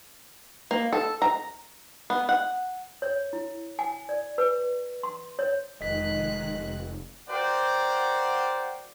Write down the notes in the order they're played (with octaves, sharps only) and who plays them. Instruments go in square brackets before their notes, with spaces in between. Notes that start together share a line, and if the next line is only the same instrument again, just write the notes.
[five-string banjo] A#3
A4
A#5
B3
F#5
[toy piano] C#5
E4
G#5
D5
B4
C6
C#5
[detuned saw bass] F1 [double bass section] D#3 [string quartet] G#3 F#6 [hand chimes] D#5 B6
[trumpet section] F#4 A#4 C5 D5 F#5 G5